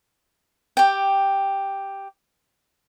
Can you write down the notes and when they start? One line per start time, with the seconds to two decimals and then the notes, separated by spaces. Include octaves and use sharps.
0.77 G4 G5